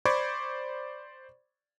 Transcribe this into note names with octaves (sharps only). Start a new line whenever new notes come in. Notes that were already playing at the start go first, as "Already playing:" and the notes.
C5 D5 B5 C#6 D6 G#6